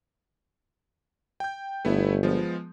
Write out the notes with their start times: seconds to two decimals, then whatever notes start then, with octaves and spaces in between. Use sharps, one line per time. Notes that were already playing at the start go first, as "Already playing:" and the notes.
1.40 G5 G6
1.85 G1 A3 B3 E4
2.23 F3 G#3 B3